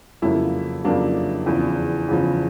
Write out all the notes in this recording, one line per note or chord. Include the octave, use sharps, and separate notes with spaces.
F2 C#3 F#3 A#3 E4
F2 C#3 F#3 A#3 D4
E2 C#3 F3
E2 C#3 F3